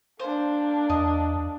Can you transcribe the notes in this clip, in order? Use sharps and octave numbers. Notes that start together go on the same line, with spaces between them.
A#3 D4 C5
E2 D#5